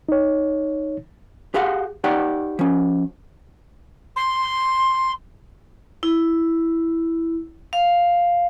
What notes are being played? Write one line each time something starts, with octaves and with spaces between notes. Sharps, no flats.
D#4 C#5
G4 G#4 F5 F#5
D#4 G4 C#5 D5 F#5
F3 C#4
C6
E4
F5